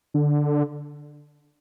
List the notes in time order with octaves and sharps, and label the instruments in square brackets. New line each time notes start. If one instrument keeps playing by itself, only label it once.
[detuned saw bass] D3